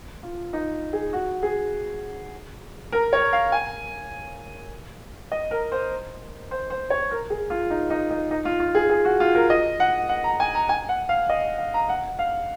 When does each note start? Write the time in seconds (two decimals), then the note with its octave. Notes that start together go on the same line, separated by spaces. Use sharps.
0.23 F4
0.53 D#4
0.93 G#4
1.13 F#4
1.43 G#4
2.92 A#4
3.13 C#5
3.33 F5
3.52 G#5
5.32 D#5
5.51 A#4
5.72 C5
6.51 C5
6.70 C5
6.90 C#5
7.11 A#4
7.30 G#4
7.50 F4
7.70 D#4
7.90 D#4
8.10 D#4
8.31 D#4
8.45 F4
8.60 F4
8.75 G#4
8.90 G#4
9.05 F#4
9.20 F4
9.35 A#4
9.50 D#5
9.80 F#5
10.09 F#5
10.24 A#5
10.40 G#5
10.55 A#5
10.69 G#5
10.89 F#5
11.09 F5
11.29 D#5
11.58 F5
11.74 A#5
11.89 F#5
12.19 F5